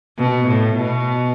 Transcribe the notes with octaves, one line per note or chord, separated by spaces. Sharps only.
B2
A2
B2